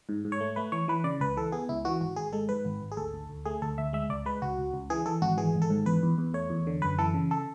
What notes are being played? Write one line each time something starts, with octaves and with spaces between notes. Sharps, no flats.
G#2
G#2
C#5
A3
A3 B4
E3 C#5
E3 B4
C#3 D5
C#2 B4
E3 A4
B3 G#4
C#2 E4
E3 F#4
G#1 F#4
G#1 G#4
G#3 A4
G#2 B4
G#1
G#1
G#4
D2 A4
D2
D2
A3 G#4
D2 A4
D2 E5
G#3 E5
C#2 D5
G#3 B4
C#2 F#4
C#2
C#2
E3 G#4
E3 A4
G#1 F#4
E3 G#4
G#1
A4
G#2
E2 B4
E2
E2
A3 C#5
E2
D3
F#2 B4
E3 A4
C#3
A4